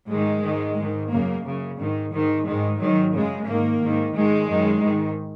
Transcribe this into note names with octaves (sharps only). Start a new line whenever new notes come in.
G#2 D#3 G#3
G#2 D#3
G#2 D#3
F#2 C#3 A#3
F#2 C#3
G#2 D#3
G#2 D#3
G#2 D#3 G#3
G#2 D#3 F#3
F#2 C#3 G#3
G#2 D#3 A#3
G#2 D#3
G#2 D#3 G#3
F#2 D#3
G#2 D#3